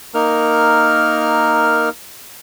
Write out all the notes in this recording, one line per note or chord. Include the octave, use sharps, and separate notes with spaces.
A#3 D#4 A#4 F6